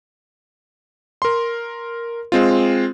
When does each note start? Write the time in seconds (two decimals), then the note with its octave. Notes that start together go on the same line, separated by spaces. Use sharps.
1.22 A#4 C6
2.32 G#3 C4 F4